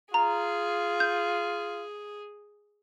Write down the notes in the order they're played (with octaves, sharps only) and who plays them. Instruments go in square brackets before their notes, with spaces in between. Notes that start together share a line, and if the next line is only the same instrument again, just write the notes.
[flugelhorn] F4 [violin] G#4 [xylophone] A#5
[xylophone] G6